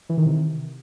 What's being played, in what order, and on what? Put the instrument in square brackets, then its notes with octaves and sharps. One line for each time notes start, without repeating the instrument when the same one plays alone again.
[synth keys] E3
D#3
C3